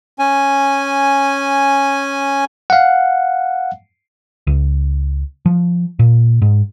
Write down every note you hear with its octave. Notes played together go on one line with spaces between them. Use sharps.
C#4 G#5
F5 F#5
C#2
F3
A#2
G#2